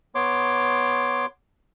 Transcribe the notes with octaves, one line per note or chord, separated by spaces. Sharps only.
B3 C#5 C6 D6